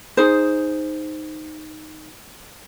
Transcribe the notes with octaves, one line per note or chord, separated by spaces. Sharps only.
D#4 G#4 C5